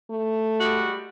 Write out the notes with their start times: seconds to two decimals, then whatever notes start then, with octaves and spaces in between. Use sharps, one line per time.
0.10 A3
0.58 G3 G#3 F#4